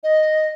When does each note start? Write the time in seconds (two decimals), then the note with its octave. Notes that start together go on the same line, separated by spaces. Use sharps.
0.03 D#5